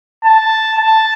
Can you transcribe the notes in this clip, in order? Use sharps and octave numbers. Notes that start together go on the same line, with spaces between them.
A5
A5